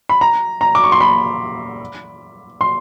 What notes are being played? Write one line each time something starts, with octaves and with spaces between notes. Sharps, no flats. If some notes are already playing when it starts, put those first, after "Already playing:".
B5
A#5
A#5
D6
C#6
C6
B5
C6